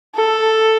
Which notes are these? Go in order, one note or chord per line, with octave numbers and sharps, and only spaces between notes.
A4